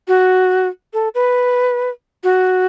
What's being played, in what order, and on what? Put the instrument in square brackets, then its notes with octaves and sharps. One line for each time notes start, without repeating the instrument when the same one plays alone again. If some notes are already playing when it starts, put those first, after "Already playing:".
[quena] F#4
A4
B4
F#4